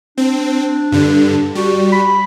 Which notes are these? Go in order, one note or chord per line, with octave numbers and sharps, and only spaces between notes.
C4 D4
G2 D3
G3 F#4
B5